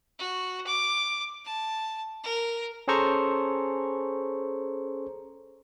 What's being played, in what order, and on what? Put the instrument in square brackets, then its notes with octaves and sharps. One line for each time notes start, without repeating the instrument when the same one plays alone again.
[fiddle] F#4
D6
A5
A#4
[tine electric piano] C#4 G#4 A4 C5 A#5 C#6